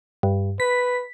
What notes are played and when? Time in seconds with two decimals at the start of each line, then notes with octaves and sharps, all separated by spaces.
0.23 G2
0.60 B4 B6